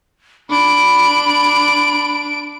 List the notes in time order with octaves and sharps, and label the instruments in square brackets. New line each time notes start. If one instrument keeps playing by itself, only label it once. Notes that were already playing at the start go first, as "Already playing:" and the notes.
[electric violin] D4 D7 [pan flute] B5